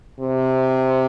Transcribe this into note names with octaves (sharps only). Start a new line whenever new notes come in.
C3